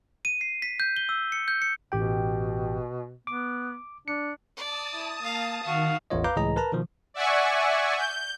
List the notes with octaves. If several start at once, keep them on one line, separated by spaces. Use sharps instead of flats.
D#7
C7
B6
G6
G7
E6
C#7
G6
C#7
A1 B2 G4 G5
B3 D6
D4 C#7
D5 A5 D#6
E4
A#3 F5
D#3 F#4 F5
A1 E2 B3 F4 C#5 D#5
B4 F5 A#5 D6 G6
C#2 A2 E3 G#4 D#5 A#5
A#4 B4 A5 A#5
B2 D#3 F3
D5 E5 F#5 G#5 C#6
G6